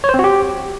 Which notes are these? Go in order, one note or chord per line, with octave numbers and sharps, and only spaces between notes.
C#5
C5
C4
F#4
G4